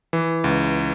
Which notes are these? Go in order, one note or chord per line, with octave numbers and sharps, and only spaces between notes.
E3
C#2